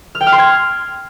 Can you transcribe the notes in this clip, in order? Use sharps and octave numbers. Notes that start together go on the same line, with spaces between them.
F6
G5
F6
C6
G#6